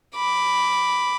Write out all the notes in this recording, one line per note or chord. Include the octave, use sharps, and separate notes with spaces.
B5 D6